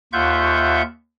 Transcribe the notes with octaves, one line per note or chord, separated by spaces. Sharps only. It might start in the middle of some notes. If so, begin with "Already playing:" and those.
D#2 F4 E5 F#5 C#6 G6